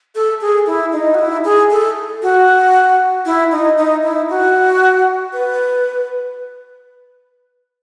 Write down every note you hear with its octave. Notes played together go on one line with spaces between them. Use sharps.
A4
G#4
E4
D#4
F#4
E4
G#4
A4
F#4
E4
D#4
D#4
E4
F#4
B4